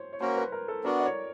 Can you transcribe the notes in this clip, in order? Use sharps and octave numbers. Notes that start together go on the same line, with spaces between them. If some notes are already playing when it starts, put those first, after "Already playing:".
Already playing: C5 C#5
C#5
A#3 C#4 F#4 A#4 C5
B4
A#4
A4
B3 D4 F#4 A#4
D5
C#5